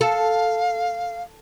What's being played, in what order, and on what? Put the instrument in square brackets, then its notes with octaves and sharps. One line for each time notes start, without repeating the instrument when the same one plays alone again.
[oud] A4 [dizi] F5